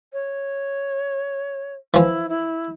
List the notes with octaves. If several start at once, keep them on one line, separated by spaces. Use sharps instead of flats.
C#5
E3 F3 E4
E4